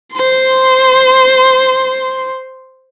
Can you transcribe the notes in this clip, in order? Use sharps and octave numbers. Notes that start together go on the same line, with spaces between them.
C5 C6